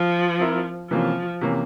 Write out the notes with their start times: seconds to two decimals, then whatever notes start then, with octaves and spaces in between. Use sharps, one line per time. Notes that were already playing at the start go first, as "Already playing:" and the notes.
Already playing: F3
0.39 C4 E4 A#4 E5
0.90 C3 E3 F3 A#3 C#4
1.41 C3 E3 A#3 C#4